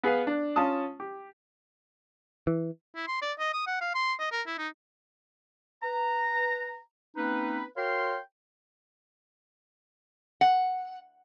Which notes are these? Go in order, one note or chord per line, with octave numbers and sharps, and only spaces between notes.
B3 G#4 B4 F5
D4
C#4 F4 A5 D#6
G4
E3
E4
C6
D5
D#5
D#6
F#5
F5
C6
D#5
A#4
E4
D#4
B4 A#5
A#3 C4 C#4 D#4 B4
F#4 A#4 C#5 F5 G5 C6
F#5